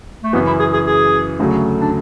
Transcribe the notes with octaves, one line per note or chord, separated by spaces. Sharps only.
A3
F#2 C#3 E3 B3
E4
G#4
G#4
G#4
D2 C#3 F#3 A3
D4